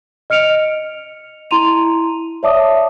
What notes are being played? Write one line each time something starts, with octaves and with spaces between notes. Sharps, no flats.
D#5 F6 C#7 D7 F7
E4 A#5 C6 D#7 F7
C#5 D5 E5 A5 D6 D#6